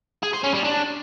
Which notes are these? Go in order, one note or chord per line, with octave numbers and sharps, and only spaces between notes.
G#4
C5
C#4
G3
D4